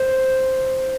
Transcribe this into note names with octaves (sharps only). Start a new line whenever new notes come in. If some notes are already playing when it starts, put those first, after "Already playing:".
Already playing: C5